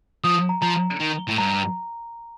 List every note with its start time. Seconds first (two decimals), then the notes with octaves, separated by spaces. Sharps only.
0.24 F3 D#6
0.49 A#5
0.62 F3 A#5
1.00 D#3
1.28 A2
1.38 G2 A#5